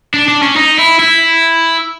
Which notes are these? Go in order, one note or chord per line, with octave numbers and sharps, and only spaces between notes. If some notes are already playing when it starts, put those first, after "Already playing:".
D4
D4
C#4
D#4
E4
E4